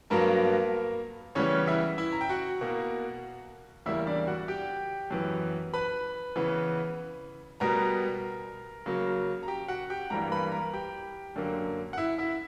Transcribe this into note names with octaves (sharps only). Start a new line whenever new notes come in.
G2 F#3 A#3 B3 A#4
C#3 E3 G3 B3 C#4 C#5
E4 E5
E4 E5
A#5
G5
F#4 F#5
B2 A#3
E2 C#3 G3 A#3 E4 E5
D4 D5
F#4 F#5
G4 G5
F#2 E3 B3
B4 B5
C#3 E3 B3
B2 G3 B3 A#4 A#5
C#3 F#3 A#3
A#5
G4 G5
F#4 F#5
G4 G5
G2 E3 G3 A#3 A#4 A#5
B4 B5
A#4 A#5
G4 G5
F#2 D3 A#3
F#5
E4 E5
E4 E5